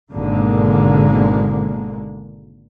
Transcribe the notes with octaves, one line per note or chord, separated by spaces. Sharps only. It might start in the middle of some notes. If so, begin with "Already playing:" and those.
G#1 B2 D3 G#3 A#3